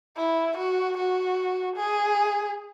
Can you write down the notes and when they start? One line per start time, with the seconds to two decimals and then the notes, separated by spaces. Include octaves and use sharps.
0.17 E4
0.57 F#4
0.97 F#4
1.76 G#4